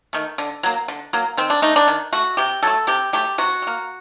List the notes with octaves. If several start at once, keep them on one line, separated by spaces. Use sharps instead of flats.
D#3 A3
D3
F#3 A#3
D3
F#3 A#3
D#3 C4
D4
A3 D#4
D4
D#3
A3 F#4
C3 G4
F#3 A3 A4
C3 G4
F#3 A3 G4
C3 F#4
G3
A#3